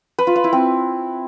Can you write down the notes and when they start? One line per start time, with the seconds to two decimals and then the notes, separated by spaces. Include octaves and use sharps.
0.19 B4
0.27 F4
0.36 F5
0.44 E4
0.53 C4